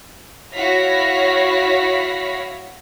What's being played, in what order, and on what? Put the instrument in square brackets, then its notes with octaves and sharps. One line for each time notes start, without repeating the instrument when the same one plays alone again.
[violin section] E4 F#4 C#5 F5 A#6 B6